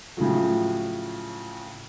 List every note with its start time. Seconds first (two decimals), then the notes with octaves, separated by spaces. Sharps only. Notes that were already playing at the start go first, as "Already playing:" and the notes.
0.17 A2 C#3 F3 F#3